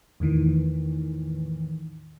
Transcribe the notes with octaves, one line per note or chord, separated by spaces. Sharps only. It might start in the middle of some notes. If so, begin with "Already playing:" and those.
E2 A2 D#3 E3